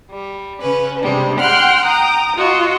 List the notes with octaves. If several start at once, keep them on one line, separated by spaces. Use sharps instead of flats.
G3
C#3 C#4 B4
C3 G3 G#3 B3 D4
F#5 G5 C6 F6 F#6
G5 A#5 D#6
F4 F#4 D#5